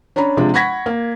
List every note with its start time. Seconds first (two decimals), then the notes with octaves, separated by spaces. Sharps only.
0.16 C#4 D4 C#5 A#5 B5
0.37 C3 F3 G#3 D4
0.54 F#5 B5 C#6 G#6 A#6 B6
0.86 A#3